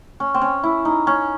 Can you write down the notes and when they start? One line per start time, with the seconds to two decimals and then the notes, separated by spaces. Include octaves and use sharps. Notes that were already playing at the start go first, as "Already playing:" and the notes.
0.20 C#4
0.34 C4
0.41 C#4
0.63 E4
0.85 D#4
1.07 C#4